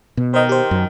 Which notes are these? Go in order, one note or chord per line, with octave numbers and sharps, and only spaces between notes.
B2
D#3 C5 D#5
G4 C5
F#2